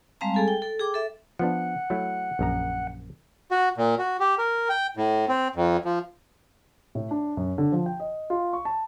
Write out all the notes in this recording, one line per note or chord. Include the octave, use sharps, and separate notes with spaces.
G3 G#3 C4 F5 A5 A#5
G#4 A4 G#5
G5
A4
G#4 G5 D6
A4 E5
F3 B3 D4 F#5
F#3 A3 E4
A#1 F#2 A#5
F#4
A#2
F#4
G4
A#4
G5
A2
C4
F2
F3
A2
D4
F#2
D3
F3
G5
D#5
F4
C#6
A5